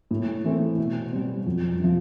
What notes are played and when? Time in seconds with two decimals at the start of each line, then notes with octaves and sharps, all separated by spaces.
0.11 A2
0.45 E3 A3 C4
0.78 B2
1.12 G3 C4
1.46 F2
1.80 C3 F3